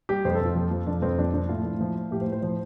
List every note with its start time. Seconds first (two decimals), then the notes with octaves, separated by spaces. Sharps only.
0.09 G3 G4
0.25 F2 C5
0.35 A4
0.41 F2 F4
0.56 F3
0.71 F3
0.87 F2 D4
1.02 F2 C4
1.19 F3 D4
1.34 F3 D4
1.49 A2 F4
1.64 A2
1.81 F3
1.95 F3
2.11 A2 G4
2.21 C5
2.26 A2
2.32 C5
2.42 F3 C5